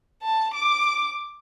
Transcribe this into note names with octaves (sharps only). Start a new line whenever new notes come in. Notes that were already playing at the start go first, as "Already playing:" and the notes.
A5
D6